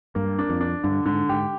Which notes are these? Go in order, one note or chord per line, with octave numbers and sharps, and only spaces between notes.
G2 A#3
D4
F2
D4
G2 D3
G#2 D3
G#2 G4